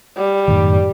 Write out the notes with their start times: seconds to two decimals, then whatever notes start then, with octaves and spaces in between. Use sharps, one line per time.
0.17 G3
0.48 F#2 A2 D#3